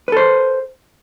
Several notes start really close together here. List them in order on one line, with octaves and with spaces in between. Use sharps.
B4 A4 C5